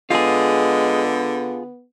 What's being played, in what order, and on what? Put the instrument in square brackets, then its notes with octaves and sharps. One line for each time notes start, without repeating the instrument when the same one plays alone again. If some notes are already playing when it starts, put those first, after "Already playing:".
[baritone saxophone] D3 [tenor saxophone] G#3 [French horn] B3 [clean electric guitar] F4 G#4